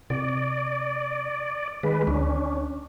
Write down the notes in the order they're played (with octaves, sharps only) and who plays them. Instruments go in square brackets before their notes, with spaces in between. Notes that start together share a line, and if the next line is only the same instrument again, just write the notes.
[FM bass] C3 [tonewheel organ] D5
[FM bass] D#3 [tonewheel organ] G#3 B4
[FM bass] D2 [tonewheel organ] C#4 D4